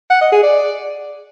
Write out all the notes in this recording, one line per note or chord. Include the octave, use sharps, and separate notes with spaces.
F#5
D#5
G#4
D5